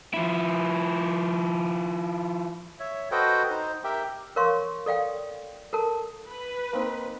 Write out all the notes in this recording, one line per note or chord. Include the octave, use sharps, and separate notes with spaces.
F3 E4
C#5 E5
F#4 A4 B4 C5 D#5 G5
D#4 C5
G4 A#4 E5 G5
A#4 C#5 F5 C6 C#6
A4 D5 F5 G5
A4 A#4 A5
B4
A#3 C4 D#4